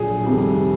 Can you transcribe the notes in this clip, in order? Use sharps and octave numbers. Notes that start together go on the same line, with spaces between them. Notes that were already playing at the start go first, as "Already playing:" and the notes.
Already playing: A#1 A#2 F#3 G#4
F2 C3 D#3 G3